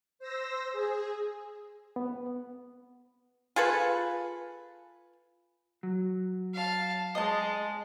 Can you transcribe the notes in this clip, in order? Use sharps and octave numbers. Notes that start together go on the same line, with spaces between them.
C5 E6 A#6
G#4
B3
F4 G#4 A4 B4
F#3
F5 A5
G#3 D#5 A5